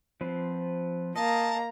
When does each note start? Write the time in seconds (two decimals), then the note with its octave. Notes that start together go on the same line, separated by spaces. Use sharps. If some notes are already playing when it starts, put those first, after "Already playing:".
0.21 F3 C4 B4
1.16 A#3 D#5 A5 A#5